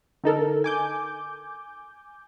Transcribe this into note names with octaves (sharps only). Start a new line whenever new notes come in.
D3 D#4 A4 A#4
G#5 D6 G6